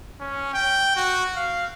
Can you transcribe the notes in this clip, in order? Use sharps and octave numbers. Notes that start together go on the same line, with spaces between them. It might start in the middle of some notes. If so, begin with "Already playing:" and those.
C#4
G5
F#4
F5